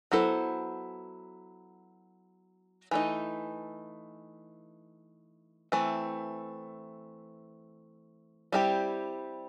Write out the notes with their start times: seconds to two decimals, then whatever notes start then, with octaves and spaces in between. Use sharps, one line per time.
0.12 F#3 B3 E4 A4 C5
2.91 E3 A3 D#4
5.72 E3 A3 C4
8.52 G3 C4 E4 G4